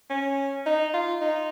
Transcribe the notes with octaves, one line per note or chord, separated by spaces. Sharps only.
C#4
D#4
F4
D#4